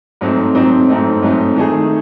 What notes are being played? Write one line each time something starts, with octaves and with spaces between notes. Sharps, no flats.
G#2 F#3 A3 C4 D#4
G#2 F#3 A3 C4 D#4
G#2 F#3 A3 C4 D#4
G#2 F#3 A3 C4 D#4
D#3 A3 D#4 G#4